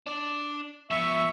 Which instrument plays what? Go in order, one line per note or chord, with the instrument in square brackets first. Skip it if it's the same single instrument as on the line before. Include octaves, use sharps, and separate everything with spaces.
[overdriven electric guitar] D4 D5
[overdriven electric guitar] F3 B3 [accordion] E5 C#6